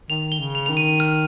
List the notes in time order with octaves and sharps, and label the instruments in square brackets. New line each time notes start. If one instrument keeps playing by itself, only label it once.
[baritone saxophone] D#3 [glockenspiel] F7
[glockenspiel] G7
[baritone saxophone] C#3
[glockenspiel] F7
[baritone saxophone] D#3 [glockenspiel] F7
[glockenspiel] D#7
F6